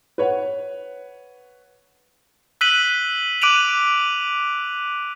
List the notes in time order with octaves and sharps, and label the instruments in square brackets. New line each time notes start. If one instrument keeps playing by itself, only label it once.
[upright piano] B4 C#5 F#5
[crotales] E6 F#6 B6 D#7 F#7
D6 F#6 D7 D#7 F7 F#7